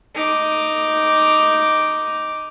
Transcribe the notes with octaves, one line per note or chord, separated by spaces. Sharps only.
D#4 D6